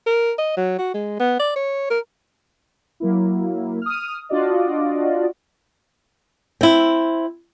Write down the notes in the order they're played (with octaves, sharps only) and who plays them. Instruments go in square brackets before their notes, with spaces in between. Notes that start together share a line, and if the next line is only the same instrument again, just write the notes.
[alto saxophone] A#4
D#5
F#3
F#4
G#3
B3
D5
C#5
A#4
[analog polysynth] F#3 A#3 E4
D#6 F6
D4 F4 F#4 D5 D#5
[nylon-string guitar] C4 E4